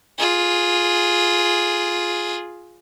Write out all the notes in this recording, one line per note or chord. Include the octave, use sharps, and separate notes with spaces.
F4 G#4